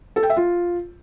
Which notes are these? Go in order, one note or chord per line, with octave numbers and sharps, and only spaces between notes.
A4
G5
E5
F4